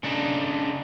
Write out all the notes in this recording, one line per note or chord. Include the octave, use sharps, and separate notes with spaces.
C#3 D4 D#4